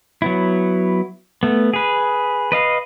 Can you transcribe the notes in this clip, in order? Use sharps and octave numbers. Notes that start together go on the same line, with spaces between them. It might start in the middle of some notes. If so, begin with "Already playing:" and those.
F#3 B3 E4
A3 B3
G#4 B4
B4 D#5 F5